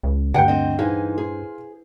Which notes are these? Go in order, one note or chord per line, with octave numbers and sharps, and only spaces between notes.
C#2
D2 G2 F#5 G5 G6
C4 D#5
E3 D#4 G#4 C5 F5
G#4